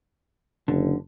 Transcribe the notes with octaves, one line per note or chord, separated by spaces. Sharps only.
F#1 D3